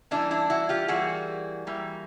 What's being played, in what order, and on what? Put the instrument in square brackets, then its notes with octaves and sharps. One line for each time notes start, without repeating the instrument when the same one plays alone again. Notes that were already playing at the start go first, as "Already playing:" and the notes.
[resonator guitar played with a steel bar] E3 G3 A#3 D4 E4
D4 E4
E4 F#4
F4 G4
E3 G3 A#3 F#4 G#4
E3 G3 A#3